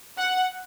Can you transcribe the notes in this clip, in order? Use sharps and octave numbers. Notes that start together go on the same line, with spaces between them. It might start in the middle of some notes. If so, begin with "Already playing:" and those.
F#5